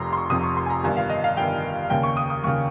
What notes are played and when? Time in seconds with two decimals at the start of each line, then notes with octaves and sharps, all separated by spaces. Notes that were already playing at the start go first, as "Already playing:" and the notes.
Already playing: F1 F2 C3 A#5 C6
0.13 C6
0.17 C#6
0.30 F1 F2 C3 D#6
0.43 C#6
0.57 C6
0.66 G#5
0.70 A#5
0.84 G1 G2 D#3 G#5
0.97 F5
1.10 D#5
1.24 F5
1.37 G1 G2 D#3 G5
1.90 D#2 C#3 G5
2.03 C#6
2.17 D#6
2.30 D#6
2.44 D#2 C#3 C#6